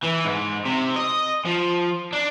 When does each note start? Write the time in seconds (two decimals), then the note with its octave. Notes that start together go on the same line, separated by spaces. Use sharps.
0.03 E3
0.25 G#2
0.66 C3
0.96 D#5
1.45 F3
2.13 D4